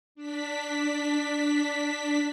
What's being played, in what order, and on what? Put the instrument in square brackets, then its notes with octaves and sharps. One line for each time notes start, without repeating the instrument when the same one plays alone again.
[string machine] D4 B6